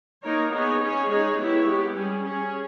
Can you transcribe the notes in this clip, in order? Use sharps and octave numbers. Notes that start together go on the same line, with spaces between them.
A#3 D#4 A#4 C#5
B3 D#4 G#4 C#5
C#4 G#4 C#5
G#3 D#4 G#4 C#5
B3 E4 G4 C#5
G#3 B3 G4
G3 C#4 G#4
C#4 G#4 C#5